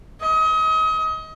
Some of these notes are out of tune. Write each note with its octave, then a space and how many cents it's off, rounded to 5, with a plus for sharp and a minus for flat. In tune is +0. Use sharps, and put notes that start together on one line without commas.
D#5 +35